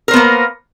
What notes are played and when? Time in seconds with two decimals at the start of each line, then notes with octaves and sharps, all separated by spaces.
0.08 A#4
0.11 C5
0.14 B3
0.16 A#3